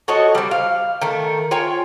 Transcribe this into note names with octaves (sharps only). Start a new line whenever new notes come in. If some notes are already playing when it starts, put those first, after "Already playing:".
F#4 A4 C#5 D#5
G3 C4
F5
D#3 A3
F4 C#5 G5 G#5